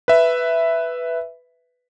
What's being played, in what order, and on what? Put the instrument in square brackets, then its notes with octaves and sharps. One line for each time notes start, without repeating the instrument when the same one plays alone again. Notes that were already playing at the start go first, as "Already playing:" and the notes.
[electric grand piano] B4 E5